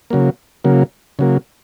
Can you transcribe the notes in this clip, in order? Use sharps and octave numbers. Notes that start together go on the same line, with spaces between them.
C#3 F#3 A#3
C#3 F#3 A#3
C#3 F#3 A#3